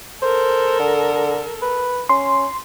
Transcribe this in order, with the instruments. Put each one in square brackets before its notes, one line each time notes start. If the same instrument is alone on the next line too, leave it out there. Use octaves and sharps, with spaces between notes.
[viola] A4 A#4 [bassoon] C5
[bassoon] D3
B4
[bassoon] C#4 [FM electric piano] C6